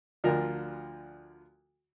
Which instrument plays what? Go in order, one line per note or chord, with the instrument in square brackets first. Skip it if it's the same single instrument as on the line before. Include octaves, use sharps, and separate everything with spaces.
[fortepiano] D2 D3 F3 F4 A#4